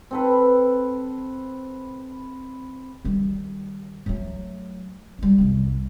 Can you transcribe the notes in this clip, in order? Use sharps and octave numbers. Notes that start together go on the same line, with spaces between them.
C4 A4 B4
D#3 G3
F#3 A3
G3 D#4
C2 F2